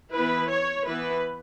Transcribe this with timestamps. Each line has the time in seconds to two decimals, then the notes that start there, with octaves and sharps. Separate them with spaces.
0.14 E3 B3 E4 B4
0.50 C#5
0.86 E3 B3 E4 B4